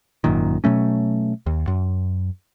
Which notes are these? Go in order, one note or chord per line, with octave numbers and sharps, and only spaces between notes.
G#1 F#2 A#2 D#3
B2 F#3 A3 C#4
D#2
F#2